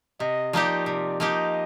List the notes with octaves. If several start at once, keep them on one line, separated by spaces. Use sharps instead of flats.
C3 D#5
F3 A#3 D#4 G4 D5
C3 D5
F3 A#3 D#4 G4 D#5